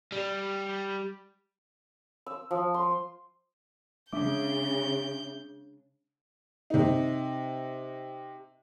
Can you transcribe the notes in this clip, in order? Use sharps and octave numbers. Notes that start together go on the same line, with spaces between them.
G3
E6
F3
C6
C#3 G#3 D4 E5 D6 G6
C3 D#4